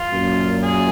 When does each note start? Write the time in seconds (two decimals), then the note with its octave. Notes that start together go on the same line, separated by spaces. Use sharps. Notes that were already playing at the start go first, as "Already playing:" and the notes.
Already playing: F4
0.12 F#2 A#2
0.63 G#4